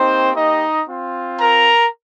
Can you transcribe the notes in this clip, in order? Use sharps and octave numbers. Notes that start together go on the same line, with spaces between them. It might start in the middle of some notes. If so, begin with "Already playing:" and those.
Already playing: A#3 C4 D#4 G4 C5
D#4 D#5
C4 F4
A#4 A#5